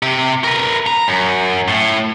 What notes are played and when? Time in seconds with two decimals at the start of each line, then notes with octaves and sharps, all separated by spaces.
0.03 C3 G4
0.44 A#4 B4
0.87 A#5
1.08 F#2
1.68 A2